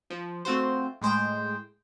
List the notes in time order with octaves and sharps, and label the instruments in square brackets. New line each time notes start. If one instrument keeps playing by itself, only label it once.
[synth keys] F3
A3 C4 F4 F#4 C5
A2 G#3 C5 G5